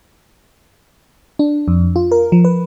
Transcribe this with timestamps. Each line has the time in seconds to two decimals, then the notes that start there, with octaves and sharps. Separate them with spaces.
1.39 D4
1.68 F2
1.96 F4
2.12 A#4
2.32 F3
2.45 B4